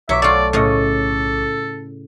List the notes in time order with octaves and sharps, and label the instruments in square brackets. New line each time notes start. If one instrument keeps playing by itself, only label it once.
[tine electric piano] B1 C#6 D6 [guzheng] F#3 [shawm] E5
[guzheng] A3 F4 [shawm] D5
[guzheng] A2 C#3 D#5 [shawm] A4